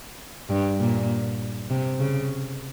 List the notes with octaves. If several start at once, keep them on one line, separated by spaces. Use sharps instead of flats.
G2
A#2
C3
C#3